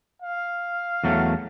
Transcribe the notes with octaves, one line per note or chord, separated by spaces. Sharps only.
F5
E2 F#3 A3